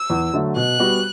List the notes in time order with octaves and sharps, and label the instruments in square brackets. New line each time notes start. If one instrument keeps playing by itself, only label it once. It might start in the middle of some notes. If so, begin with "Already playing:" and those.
Already playing: [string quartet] E6
[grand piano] E2
D3 F#3 A3
[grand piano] B2 [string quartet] F#6
[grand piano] G3 B3 F#4